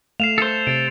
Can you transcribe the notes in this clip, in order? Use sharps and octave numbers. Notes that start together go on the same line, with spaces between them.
A3 F5 C7 E7 F7
A4 C5
C3 A6 D7